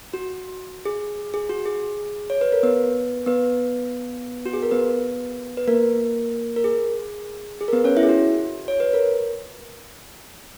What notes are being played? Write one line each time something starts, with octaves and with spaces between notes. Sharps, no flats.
F#4
G#4
G#4
F#4
G#4
C#5
B4
A#4
B3 B4
B3 B4
F#4
G#4
A#4
B3 B4
B4
A#3 A#4
A#4
G#4
G#4
A#4
B3 B4
C#4 C#5
E4 E5
G#4
F#4
C#5
B4
A#4